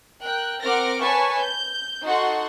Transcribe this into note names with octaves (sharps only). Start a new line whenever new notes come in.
A#4 G5 F#6
C4 A#4 F#5 D6 F6 A#6
B4 C#5 G#5 A5 C#6
G6
D#4 F#4 A4 F#5 C6 C#6